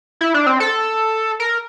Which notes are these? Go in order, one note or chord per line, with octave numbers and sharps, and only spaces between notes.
E4
D4
C4
A4
A#4